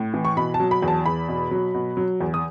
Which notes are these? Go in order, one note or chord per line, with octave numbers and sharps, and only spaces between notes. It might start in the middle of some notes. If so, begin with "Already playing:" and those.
Already playing: A2
E3
C#6
B2 B5
A5
F#3
B5
E2
A5
E2 B5
B2
F#3
B2
F#3
E2
D#6